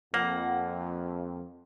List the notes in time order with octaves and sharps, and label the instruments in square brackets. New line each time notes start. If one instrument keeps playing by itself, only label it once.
[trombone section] F2 [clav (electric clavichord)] A#3 [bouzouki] F#5